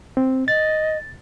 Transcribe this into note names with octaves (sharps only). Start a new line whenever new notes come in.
C4
D#5 A6